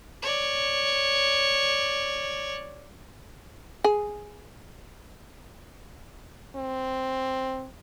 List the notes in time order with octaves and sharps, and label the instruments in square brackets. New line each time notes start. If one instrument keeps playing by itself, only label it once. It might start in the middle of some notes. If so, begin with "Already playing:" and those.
[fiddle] C#5 D5
[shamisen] G#4
[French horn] C4